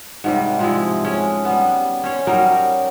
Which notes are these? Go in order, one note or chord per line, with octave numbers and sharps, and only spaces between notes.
G#2 C3 G3
C3 F3 G#3 E4
G#3 C#4
G3 B3
C#4 C5 C#5
F#3 G3 D#4 A#4